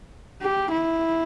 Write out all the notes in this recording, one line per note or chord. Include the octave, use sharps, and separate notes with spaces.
G4
E4